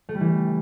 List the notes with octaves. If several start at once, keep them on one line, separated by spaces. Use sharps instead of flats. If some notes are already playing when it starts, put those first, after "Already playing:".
A3
G3
E3